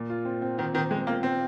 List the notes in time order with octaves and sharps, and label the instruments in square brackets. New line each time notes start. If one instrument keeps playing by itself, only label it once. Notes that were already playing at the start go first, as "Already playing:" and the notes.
Already playing: [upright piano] A#2
F4
C4
C4
[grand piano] D#3 [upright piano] C4
[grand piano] D#3 [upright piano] C4
[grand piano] G#3 [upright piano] C4
[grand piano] A#3 [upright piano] F4
[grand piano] C4